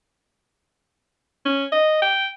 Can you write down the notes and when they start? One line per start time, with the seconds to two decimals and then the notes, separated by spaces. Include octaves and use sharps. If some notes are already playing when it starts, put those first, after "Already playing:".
1.45 C#4
1.72 D#5
2.02 G5